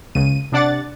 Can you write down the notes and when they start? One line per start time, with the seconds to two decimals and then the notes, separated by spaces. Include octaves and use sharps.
0.15 C#2 C#3 D#7
0.52 C3 D4 D5 F#5 A6